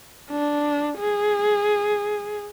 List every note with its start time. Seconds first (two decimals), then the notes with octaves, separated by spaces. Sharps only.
0.30 D4
0.99 G#4